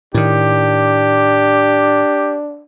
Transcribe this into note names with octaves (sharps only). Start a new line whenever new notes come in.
A2 D#3 D4 G4